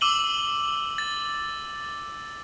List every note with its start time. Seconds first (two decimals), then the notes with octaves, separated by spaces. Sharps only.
0.01 D6 E6 D#7 F#7 G7
0.98 A6